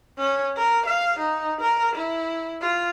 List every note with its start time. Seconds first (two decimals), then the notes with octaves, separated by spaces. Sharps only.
0.18 C#4
0.57 A#4
0.85 F5
1.19 D#4
1.60 A#4
1.95 E4
2.61 F4